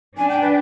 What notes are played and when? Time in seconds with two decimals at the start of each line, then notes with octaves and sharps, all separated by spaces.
0.17 D4 G#5
0.28 G5
0.41 B4